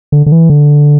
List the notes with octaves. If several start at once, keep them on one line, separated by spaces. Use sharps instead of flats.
D3
D3
E3
D3